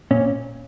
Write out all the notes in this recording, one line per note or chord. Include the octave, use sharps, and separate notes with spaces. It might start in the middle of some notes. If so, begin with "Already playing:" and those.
A#2 C#4